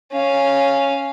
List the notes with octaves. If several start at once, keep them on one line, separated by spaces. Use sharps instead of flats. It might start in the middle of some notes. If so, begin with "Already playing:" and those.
C#4 F5